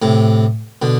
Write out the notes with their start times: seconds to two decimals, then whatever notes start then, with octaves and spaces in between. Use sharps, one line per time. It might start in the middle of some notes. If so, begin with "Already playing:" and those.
0.02 A2 C3
0.82 B2 D3